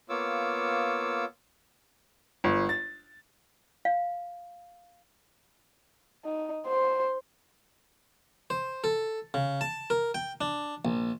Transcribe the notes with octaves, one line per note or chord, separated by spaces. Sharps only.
A#3 B3 F4 C#5 D6 E6
G1
A6
F5
D#4
C5
C5
A4
C#3
A5
A#4
G5
D4
A#1